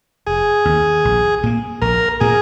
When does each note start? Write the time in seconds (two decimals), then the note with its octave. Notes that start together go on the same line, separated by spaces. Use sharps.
0.27 F1 G#4
0.65 D#2 D#3
1.05 A#1
1.43 A#2 A#3
1.82 A#1 A#4
2.20 A#2 A#3 G#4